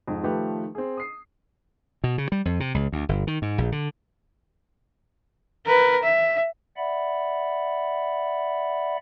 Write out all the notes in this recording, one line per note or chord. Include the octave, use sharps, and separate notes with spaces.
F2 G#2
D#3 F3 A3 G4 B4
C4 G#4
D#6 C7
B2
C#3
G3
F2
C3
C#2
D2
G1
D#3
G#2
A#1
D3
A#4 B4
E5
D5 E5 F#5 B5